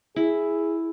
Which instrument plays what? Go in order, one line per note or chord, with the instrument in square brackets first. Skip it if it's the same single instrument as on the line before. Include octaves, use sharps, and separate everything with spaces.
[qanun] E4 [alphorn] G#4